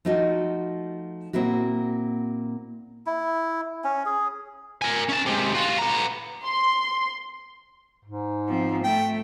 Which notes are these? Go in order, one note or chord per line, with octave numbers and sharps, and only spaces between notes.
F3 A3 D#4 F4 F#4
A#2 A#3 C4 E4 F#4
E4
C#4
G#4
A#4 G#5
C#4 A5
G#2 C3
F4 F#4
B3 A#5
C6
G#2
F3 C4
A3 G5